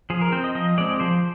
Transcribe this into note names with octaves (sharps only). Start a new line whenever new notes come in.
F3 G#4
A#4
C4 C5
D#5
F3 D#5
G#3 C4 D5
F3 C5